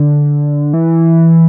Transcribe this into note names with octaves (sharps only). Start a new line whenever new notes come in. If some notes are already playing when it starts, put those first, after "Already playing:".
Already playing: D3
E3